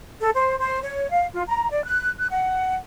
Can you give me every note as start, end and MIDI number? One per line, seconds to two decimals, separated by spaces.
0.20 0.29 69
0.34 0.56 72
0.59 0.79 72
0.82 1.07 73
1.11 1.26 77
1.33 1.43 65
1.46 1.68 82
1.71 1.84 74
1.85 2.08 90
2.18 2.27 90
2.30 2.75 78